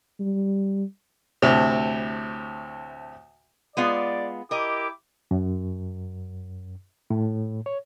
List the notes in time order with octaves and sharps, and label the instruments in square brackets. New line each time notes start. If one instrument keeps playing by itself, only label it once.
[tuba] G3
[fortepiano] D2 A2 C3
[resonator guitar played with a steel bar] G#3 B3 F4 [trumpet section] D5
[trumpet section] E4 G4 D6 [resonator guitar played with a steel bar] A#4 D#5
[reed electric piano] F#2
A2
C#5